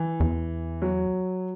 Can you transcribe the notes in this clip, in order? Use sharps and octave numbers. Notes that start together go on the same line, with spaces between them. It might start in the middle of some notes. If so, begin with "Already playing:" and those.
Already playing: E3
E2
F#3